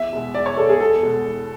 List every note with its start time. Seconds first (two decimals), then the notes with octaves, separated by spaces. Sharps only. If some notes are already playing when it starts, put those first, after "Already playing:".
Already playing: E2 E5
0.13 B2 G#3
0.35 E2 D5
0.46 C#5
0.57 B2 G#3 A4
0.69 G#4
0.80 E2 A4
1.03 B2 G#3
1.25 E2